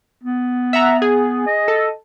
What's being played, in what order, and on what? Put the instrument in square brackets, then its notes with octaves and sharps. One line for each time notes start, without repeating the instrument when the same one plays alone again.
[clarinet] B3
[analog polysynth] E5 F#5 A#5
G#4
[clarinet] D#5
[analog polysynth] A4